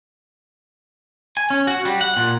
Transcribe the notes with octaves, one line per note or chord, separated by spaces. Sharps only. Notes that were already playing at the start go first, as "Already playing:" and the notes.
G#5
C#4
F#4
G3
F#5
A#2